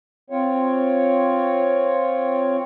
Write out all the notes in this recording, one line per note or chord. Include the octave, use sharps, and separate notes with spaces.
C4 F4 C#5